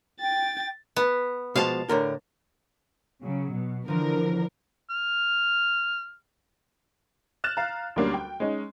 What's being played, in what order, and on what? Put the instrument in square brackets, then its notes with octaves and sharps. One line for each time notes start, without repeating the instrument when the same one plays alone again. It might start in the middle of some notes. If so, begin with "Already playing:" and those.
[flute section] G5 [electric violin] A6
[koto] B3
[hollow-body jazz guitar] B2 F3 G#3 [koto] F5 A5
[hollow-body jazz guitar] A2 D3 A#4
[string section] C#3 F#3
B2
[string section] D3 A#4 [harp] E3 F3
[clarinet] F6
[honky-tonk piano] F6 F#6 A6 E7
F5 A#5
D2 F#3 G3 A#3 C#4 D4
G5
G#3 C#4 D#4